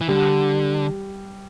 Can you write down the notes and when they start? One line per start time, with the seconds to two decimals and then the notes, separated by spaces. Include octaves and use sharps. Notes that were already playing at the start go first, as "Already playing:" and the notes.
0.01 E3
0.08 D3 G3